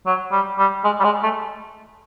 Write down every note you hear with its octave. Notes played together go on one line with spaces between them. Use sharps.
F#3
G3
G3
G#3
G3
G#3
A3